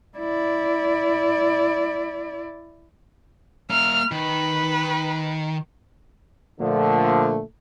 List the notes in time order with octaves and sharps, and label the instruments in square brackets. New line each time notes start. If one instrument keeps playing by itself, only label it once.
[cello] E4 D5
[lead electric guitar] A#3 E5 [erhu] F6
[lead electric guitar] D#3 [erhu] B4
[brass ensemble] A#2 D3 F3 A3